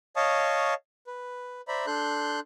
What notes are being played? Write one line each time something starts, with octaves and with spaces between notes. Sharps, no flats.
C#5 D#5 F5 A5 C#6 D#6
B4
C5 D5 E5 A#5 B5
D4 A4 C6 F#6 G6